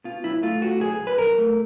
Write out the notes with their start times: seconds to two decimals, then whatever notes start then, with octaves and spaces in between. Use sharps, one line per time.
0.04 B2 F4
0.24 B1 E4
0.42 A3 F4
0.61 A3 F#4
0.81 B1 G#4
1.00 B1
1.07 B4
1.18 B1 A#4
1.38 A3